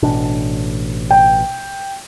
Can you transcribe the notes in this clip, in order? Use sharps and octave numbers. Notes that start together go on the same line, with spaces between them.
A1 B2 D4
G5